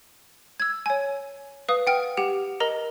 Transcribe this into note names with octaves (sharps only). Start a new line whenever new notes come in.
E6 G#6
C#5 G#5
B4 F5 D#6
F#5 G5 F6
G4 F#5 F7
A#4 D#5 A#5 A#6